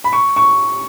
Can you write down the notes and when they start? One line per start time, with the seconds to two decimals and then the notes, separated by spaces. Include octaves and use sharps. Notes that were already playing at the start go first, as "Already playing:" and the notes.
0.04 B5
0.13 C#6
0.36 C#6